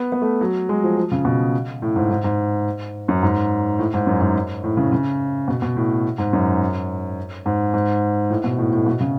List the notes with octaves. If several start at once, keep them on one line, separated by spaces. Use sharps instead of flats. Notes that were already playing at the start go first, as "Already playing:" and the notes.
Already playing: B3
B3
A3
F#3
G#3
F3
F3
C#3
B2
A2
G#2
G#2
G#2
F#2
G#2
A2
G#2
F#2
G#2
A2
C#3
C#3
B2
B2
A2
G#2
F#2
G#2
G#2
A2
B2
A2
A2
B2
C#3